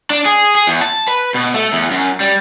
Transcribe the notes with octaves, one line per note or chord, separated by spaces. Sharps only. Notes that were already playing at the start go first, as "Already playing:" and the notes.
D4
G#4
G#4
E2
A5
B4
B2
A3
E2
F#2
G3